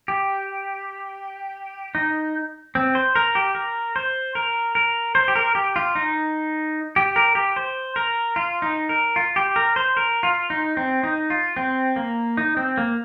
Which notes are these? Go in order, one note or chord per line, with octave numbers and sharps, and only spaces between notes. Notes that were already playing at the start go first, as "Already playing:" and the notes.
G4
D#4
C4
C5
A#4
G4
A#4
C5
A#4
A#4
C5
G4
A#4
G4
F4
D#4
G4
A#4
G4
C5
A#4
F4
D#4
A#4
F4
G4
A#4
C5
A#4
F4
D#4
C4
D#4
F4
C4
A#3
D#4
C4
A#3